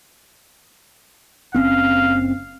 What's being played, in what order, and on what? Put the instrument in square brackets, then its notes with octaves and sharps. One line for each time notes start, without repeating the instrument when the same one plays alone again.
[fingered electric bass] F#1 C4 C#4 [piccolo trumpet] F5